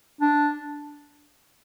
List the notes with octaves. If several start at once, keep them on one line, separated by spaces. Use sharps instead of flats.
D4